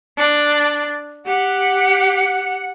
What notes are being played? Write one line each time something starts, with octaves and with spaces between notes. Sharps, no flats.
D4
G4 F#5